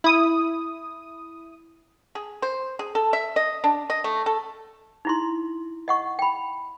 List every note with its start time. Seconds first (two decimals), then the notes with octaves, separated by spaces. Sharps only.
0.04 E4 D#6
2.15 G#4
2.42 C5
2.79 G#4
2.95 A4
3.13 E5
3.36 D#5
3.64 D4
3.90 D#5
4.04 A3
4.26 A4
5.05 D#4 E4 C6
5.88 D#5 F#5 C#6
6.19 G5 B5